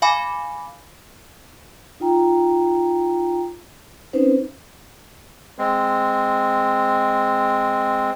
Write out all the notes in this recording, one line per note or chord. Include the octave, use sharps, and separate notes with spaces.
F5 G#5 B5 D6
D#4 F4 G5 A#5
C4 C#4 D#4 B4 C5
G#3 C4